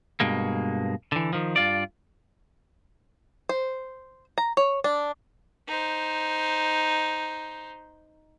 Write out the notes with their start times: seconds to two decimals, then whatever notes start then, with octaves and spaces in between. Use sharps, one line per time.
0.20 G2 B2 G#3 A#3
1.12 D3 E3
1.33 D#3 F3
1.56 G2 F4 D5
3.49 C5
4.38 A#5
4.57 C#5
4.84 D4
5.68 D#4 C5